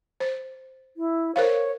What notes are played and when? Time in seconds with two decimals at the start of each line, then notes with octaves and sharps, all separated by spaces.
0.20 C5
0.97 E4
1.36 A#4 C5 C#5 F5